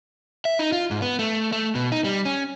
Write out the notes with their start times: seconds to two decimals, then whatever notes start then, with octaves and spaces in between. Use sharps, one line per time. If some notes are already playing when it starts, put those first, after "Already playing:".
0.45 E5
0.59 D#4
0.72 F4
0.91 G#2
1.02 B3
1.19 A3
1.52 A3
1.75 B2
1.92 D#4
2.04 G3
2.25 C#4